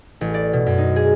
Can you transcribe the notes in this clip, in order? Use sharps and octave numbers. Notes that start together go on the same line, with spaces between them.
A1
D5
B2
F#2
D#4
G#4